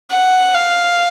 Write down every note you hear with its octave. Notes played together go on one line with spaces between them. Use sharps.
F#5
F5